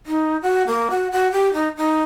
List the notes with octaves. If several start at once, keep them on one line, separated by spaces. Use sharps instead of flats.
D#4
F#4
A#3
F#4
F#4
G4
D#4
D#4